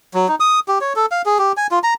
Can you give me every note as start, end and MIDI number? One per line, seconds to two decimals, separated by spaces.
0.14 0.28 54
0.28 0.35 63
0.40 0.60 87
0.68 0.79 67
0.81 0.93 73
0.96 1.06 69
1.11 1.22 77
1.26 1.38 68
1.39 1.52 67
1.57 1.67 80
1.71 1.79 65
1.83 1.94 82